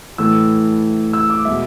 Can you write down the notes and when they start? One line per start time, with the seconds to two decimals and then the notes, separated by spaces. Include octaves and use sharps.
0.18 A2 E3 A3 E6
1.13 E6
1.30 D6
1.45 B2 G#3 E5